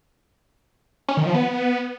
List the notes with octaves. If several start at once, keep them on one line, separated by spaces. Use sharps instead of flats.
C#4
D#3
F3
B3